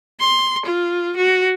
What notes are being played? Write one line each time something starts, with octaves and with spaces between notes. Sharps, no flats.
C6
F4
F#4